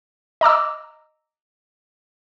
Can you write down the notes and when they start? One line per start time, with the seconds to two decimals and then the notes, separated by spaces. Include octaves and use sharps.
0.41 D#5 A#5 D6 E6